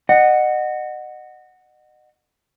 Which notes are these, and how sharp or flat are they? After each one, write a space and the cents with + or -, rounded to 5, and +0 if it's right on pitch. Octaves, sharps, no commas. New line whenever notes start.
D#5 -30 F#5 +0